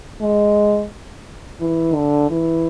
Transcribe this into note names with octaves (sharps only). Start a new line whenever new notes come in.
G#3
E3
D3
E3